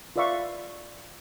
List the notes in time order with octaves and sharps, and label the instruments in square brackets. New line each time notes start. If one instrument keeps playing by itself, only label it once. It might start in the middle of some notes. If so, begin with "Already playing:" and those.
[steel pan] F4 B4 D5 E5 F5 C#6